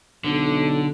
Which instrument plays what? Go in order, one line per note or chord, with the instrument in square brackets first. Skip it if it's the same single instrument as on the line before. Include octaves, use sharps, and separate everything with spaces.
[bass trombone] B1 [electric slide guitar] D3